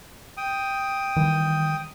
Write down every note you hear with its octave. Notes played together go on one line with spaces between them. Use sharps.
G5 D#6
D#3 E3 G3